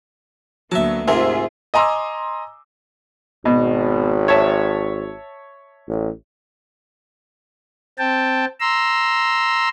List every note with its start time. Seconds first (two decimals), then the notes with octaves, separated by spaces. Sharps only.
0.72 D2 F#3 A#3 B3 E5 A5
1.08 G#2 C3 F4 G#4 A#4 E5 G#5 C6
1.74 D#5 G#5 A#5 C6 D6 E6
3.45 G#1 B2
4.28 C#5 E5 A5
5.88 A1
7.99 C4 G5 A5
8.60 A#5 C6 E6